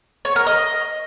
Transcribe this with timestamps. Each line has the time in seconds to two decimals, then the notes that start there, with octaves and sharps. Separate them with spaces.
0.25 C#5
0.36 A#4
0.47 D#5